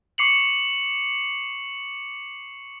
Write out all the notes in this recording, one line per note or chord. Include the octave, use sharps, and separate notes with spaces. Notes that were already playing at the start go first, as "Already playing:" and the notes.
C#6 D6 C7 C#7 F7 F#7